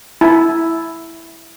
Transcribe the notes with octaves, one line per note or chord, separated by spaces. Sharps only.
E4